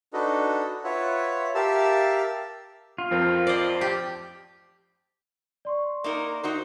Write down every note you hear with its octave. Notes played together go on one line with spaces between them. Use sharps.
D4 D#4 F#4 A4 B4 D#5
F4 B4 C#5 E5 F#5
G4 A#4 E5 F5 A5 E6
F4
F2 F3 C4 A#4
C5 D5 D#5
G4
D5 C6 C#6
A#3 D#4 A#4
D#4 F#4 C5